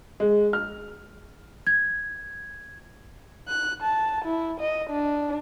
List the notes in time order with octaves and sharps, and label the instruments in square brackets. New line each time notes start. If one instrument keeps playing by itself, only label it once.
[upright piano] G#3
F6
[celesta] G#6
[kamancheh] F#6
A5
E4
D#5
D4